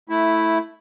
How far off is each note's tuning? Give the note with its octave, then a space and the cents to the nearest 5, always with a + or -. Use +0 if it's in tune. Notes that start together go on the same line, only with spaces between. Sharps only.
A3 +0 E4 -5